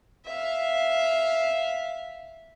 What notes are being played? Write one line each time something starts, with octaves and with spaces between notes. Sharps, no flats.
E5 F5